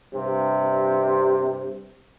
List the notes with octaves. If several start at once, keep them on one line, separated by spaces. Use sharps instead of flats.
G2 C3